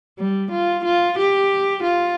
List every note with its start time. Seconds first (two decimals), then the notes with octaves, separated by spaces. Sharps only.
0.19 G3
0.51 F4
0.85 F4
1.18 G4
1.83 F4